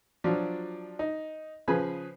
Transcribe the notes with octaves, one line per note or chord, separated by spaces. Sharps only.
F3 F#3 D4 F4
D#4
C#3 F3 G#4 B4 G#5 B5